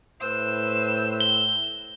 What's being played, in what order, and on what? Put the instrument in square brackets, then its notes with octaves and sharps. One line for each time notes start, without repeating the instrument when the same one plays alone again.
[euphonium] A2 [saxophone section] B4 C5 [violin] E6
[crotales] G7